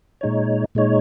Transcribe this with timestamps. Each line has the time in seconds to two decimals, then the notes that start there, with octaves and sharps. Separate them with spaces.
0.21 A#2 G#3 D#4 C#5
0.75 A#2 G#3 D#4 C#5